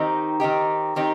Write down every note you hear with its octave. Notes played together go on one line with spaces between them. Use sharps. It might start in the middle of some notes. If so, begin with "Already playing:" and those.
Already playing: D#3 C4 D#4 G4
D#3 C4 D#4 G4
D#3 C4 D#4 G4